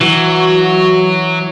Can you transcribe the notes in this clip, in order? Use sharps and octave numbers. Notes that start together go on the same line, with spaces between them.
E3 F#3 F#4